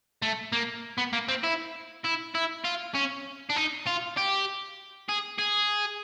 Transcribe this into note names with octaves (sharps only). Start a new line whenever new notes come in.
A3
A#3
B3
A#3
C4
E4
E4
E4
F4
C#4
D4
D#4
F4
G4
G#4
G#4